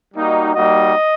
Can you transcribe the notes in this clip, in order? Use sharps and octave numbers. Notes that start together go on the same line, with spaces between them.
G3 A#3 D#4 F#4
G3 A#3 D#4 F#4 D#5